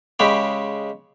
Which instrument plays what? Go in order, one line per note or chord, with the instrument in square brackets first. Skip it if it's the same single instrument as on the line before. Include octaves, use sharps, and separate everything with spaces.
[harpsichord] C#3 G#3 G4 B5